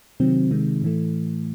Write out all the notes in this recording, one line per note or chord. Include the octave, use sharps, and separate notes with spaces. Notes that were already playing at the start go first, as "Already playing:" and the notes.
C3 D#3 F#3 C4
C3 D#3 G#3
A2 E3 A3